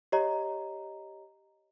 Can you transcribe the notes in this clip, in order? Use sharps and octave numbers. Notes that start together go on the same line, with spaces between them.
G4 C#5 D#5 A#5